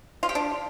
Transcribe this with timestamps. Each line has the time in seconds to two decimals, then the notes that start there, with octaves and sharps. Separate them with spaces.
0.23 F4
0.29 G4
0.35 D4